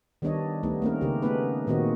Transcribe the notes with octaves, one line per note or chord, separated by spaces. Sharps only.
D#3 G3 B3 D4 C#5 D#5
G3 A3 B3 D#4
A3 A#3 C4 C#4 A#4
C#3 G4
A3 B3 C#4 D#4 B4
A#2 D#3 A#3 C4 F#4 D#5